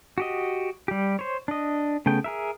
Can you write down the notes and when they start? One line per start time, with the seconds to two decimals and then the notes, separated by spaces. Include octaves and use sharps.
0.18 F#4 G4 D#5
0.88 G3 G4
1.19 C5 C#5
1.48 D4 D#5
2.06 C#3 A3 B3 G5
2.24 G#4 A#4 E5